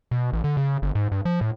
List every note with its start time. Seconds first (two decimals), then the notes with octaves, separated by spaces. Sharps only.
0.11 B2
0.33 A1
0.44 D3
0.57 C#3
0.82 G1
0.95 G#2
1.12 G2
1.25 F3
1.41 A2